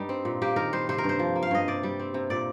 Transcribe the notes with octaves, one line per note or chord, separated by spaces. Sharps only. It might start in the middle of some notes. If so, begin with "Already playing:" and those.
Already playing: G2 G3 D#4
C4
A#2
A#3 G4
D#3 A#4
G3 C5
C3 C5
A#4
G2
C5
F3
A#3
F5
G2 D#5
C3 D5
G3
C4
C3
A#2 D5